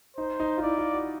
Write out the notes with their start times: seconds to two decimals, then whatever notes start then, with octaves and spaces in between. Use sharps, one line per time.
0.17 D#4 C5
0.40 D#4
0.58 F4
0.62 E4 D5
0.78 F4
0.93 F#4